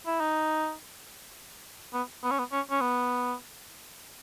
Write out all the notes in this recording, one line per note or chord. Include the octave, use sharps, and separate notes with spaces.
E4
D#4
B3
B3
C#4
B3
C#4
C#4
B3